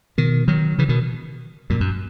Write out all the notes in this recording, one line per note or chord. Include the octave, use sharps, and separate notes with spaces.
B2 D#3
D#3 F#3
C#3 E3
B2 D#3
F#2 A#2
F#2